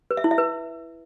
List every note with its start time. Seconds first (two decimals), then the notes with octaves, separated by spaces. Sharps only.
0.11 B4
0.17 E5
0.24 E4
0.31 E5
0.38 B4